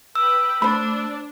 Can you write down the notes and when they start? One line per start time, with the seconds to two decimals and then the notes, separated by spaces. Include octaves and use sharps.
0.15 B4 G5 B5 E6
0.62 A3 D4 C5 B5